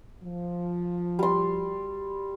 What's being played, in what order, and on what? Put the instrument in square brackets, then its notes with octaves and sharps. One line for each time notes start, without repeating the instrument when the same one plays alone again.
[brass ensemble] F3
[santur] G3 C6